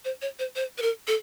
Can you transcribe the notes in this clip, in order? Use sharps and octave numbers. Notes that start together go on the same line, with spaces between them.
C5
C#5
C5
C5
B4
A#4
A4